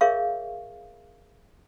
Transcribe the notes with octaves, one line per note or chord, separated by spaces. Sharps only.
G#4 A#4 C#5 E5 F5 C#6